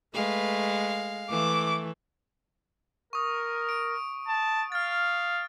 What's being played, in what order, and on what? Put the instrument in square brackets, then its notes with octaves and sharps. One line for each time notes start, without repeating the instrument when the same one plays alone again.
[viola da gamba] G#3 [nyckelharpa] A3 B4 [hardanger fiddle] F5
[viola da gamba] E3 [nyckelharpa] A3 [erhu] D6
[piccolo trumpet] A#4 [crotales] C#6 D#6
[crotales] D7
[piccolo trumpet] A5
[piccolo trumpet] F5 [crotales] F6 A6